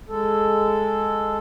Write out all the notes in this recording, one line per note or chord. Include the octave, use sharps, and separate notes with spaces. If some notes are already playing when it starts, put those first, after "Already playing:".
G#3 A4